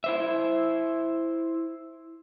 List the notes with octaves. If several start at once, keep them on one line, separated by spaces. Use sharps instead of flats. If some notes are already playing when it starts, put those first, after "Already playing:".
E4 C5 E5